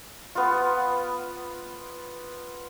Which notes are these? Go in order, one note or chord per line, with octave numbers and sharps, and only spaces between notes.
B3 F4